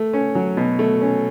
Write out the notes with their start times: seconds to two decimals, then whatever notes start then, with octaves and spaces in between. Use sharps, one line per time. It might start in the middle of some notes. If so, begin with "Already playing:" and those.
Already playing: A3
0.13 C#4
0.35 F#3
0.57 B2
0.79 A3
1.01 C#4